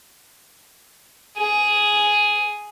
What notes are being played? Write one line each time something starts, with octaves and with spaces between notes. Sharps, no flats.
G#4